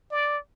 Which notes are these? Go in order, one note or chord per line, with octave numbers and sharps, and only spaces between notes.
D5